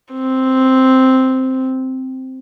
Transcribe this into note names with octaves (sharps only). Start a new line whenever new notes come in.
C4